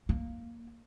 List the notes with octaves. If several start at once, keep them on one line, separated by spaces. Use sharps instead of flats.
A#3